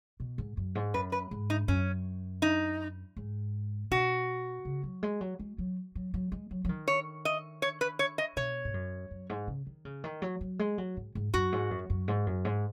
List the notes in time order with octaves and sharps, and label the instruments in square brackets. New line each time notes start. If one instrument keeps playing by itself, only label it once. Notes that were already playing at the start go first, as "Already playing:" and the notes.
[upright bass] B2
G#2
F#2
G#2
[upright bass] F#2 [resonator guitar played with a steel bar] B4
[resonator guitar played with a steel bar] B4
[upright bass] G#2
[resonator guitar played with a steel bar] D#4
[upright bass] F#2 [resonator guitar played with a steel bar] C#4
[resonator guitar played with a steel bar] D#4
[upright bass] G#2
[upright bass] B2 [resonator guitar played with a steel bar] F#4
[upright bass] C#3
F#3
G#3
F#3
G#3
F#3
F#3
F#3
G#3
F#3
F#3
D#3
[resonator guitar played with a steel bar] C#5
D#5
C#5
B4
C#5
D#5
[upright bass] B2 [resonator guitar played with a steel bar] C#5
[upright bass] G#2
F#2
F#2
G#2
C#3
D#3
C#3
D#3
F#3
F#3
G#3
F#3
G#2
G#2
[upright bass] F#2 [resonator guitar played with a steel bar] F#4
[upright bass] G#2
F#2
F#2
G#2
F#2
G#2